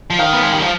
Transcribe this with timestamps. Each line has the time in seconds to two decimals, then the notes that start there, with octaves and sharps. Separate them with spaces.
0.10 F3
0.19 D#3 F5
0.33 B3
0.43 G#3
0.52 G3
0.62 F3